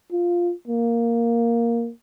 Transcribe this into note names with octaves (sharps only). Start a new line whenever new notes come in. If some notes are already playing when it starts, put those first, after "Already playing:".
F4
A#3